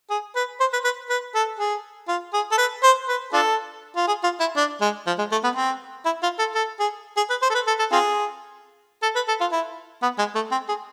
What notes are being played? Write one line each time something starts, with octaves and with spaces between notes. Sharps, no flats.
G#4
B4
C5
B4
B4
B4
A4
G#4
F4
G#4
A4
B4
C5
B4
D4 F4 A4
F4
G#4
F4
E4
D4
G#3
F3
G#3
A3
B3
C4
E4
F4
A4
A4
G#4
G#4
B4
C5
A4
B4
A4
A4
C4 F4 G#4
A4
B4
A4
F4
E4
B3
G#3
A3
C4
G#4